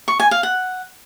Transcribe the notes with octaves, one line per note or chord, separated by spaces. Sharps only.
C#6
G#5
F5
F#5